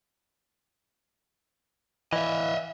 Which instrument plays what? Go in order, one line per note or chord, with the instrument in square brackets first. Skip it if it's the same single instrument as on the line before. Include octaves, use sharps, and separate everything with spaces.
[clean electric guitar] E3 [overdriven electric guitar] D#5 E5